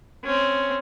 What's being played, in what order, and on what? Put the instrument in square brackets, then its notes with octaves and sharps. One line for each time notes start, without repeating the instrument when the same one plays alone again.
[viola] C4 C#4